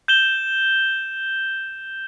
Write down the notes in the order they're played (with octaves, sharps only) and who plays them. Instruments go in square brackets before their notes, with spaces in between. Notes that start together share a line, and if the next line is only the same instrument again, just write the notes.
[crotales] G6 E7 G7